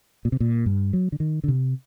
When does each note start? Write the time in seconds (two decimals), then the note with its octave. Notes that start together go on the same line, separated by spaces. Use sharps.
0.25 A#2
0.32 C3
0.40 A#2
0.66 G2
0.93 F#3
1.12 D3
1.20 D#3
1.44 D3
1.48 C3